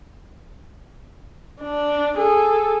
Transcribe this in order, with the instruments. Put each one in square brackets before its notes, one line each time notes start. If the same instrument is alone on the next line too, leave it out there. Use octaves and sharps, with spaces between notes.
[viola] D4
G#4 A4